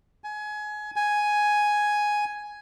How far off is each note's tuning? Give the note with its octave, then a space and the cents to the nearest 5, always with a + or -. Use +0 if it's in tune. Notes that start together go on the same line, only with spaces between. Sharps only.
G#5 +25
G#5 +5